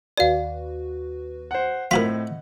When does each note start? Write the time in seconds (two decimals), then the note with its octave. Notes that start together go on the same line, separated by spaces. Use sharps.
0.17 D#2 F#4 B4 D5 F5
1.51 C5 F#5
1.91 A2 C4 F4 F#4 A#4 D#5 F#5 B6